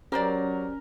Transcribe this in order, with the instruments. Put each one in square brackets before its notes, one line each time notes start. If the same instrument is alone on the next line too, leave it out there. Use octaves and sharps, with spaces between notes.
[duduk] F#3 [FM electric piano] C#4 [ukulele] G4 C5 D5 [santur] A#4